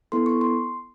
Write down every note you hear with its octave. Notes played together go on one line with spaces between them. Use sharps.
B3 E4 A4 C6
C#6
C6